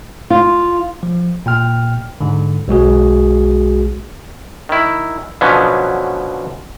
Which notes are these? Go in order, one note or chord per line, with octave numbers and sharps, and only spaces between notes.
F4
F3
A#2 G5 F6
G#2 D3
B1 G#3 F#4 G#4
D#3 E4
B2 D3 F3 F#3 B3 C#4